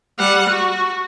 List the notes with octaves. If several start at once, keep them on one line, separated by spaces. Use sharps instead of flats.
G3 F#5
F#4